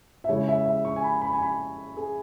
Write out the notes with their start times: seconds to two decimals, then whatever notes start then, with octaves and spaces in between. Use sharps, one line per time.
0.24 E5
0.28 C#3 G#3 C#4 E4 C#5
0.48 E5
0.66 E5
0.85 C#6
0.96 G#5
1.04 B5
1.22 B5
1.33 G#5
1.43 B5
1.97 G#4